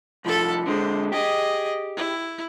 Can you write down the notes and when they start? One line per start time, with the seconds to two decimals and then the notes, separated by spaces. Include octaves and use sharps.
0.25 C2 F3 A4 B5
0.66 D3 G#3 C5
1.12 G4 G#4 D#5
1.97 E4